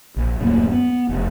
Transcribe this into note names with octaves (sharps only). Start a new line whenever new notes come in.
A#1
D1 F#2 A2 A#3
B3
F1